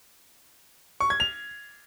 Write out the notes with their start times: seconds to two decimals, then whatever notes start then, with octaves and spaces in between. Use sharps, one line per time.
1.00 C#6
1.10 G#6
1.20 F7